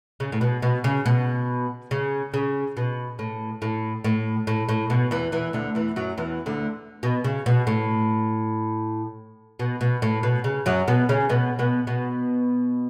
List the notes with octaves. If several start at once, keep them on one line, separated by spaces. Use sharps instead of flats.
C#3
A2
B2
B2
C#3
B2
C#3
C#3
B2
A2
A2
A2
A2
A2
B2
E2 E3
E2 E3
D2 D3
E2 E3
F#2 F#3
E2 E3
D2 D3
B2
C#3
B2
A2
B2
B2
A2
B2
C#3
F#2 F#3
B2 B3
C#3 C#4
B2 B3
B2 B3
B2 B3